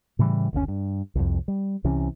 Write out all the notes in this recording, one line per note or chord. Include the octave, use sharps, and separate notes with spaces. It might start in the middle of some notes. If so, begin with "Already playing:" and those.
A2 C#3 E3 G3
F#1 D2 C#3 C#4
G2
C2 F2
G3
C2 C3 E3 C#4